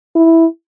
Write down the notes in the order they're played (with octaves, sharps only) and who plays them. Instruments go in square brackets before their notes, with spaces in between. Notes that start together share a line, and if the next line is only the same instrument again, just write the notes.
[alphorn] E4